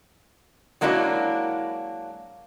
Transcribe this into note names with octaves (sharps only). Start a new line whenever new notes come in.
F#3 G#3 A#3 D4 E4 F#4